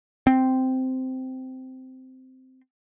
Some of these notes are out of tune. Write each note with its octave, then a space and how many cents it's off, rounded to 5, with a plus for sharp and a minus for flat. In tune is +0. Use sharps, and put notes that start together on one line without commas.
C4 -10